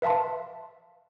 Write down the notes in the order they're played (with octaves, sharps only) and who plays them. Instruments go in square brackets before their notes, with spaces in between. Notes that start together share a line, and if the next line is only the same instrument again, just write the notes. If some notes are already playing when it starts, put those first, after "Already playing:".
[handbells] B4 E5 F5 A5 C6